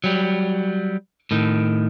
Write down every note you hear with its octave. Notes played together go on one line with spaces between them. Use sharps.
F#3 G3
A2 D#3